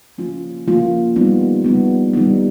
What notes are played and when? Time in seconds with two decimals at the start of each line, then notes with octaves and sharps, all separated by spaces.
0.18 F3 A#3 C#4 F4
0.67 F3 A#3 C#4 F4
1.16 G3 B3 D#4
1.64 G3 B3 D#4
2.13 G3 B3 D#4